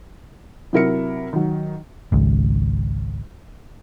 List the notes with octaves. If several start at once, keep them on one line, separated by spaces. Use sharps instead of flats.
C3 F#3 E4 A#4 E5 C#7
D#3 F#3
G#1 C#2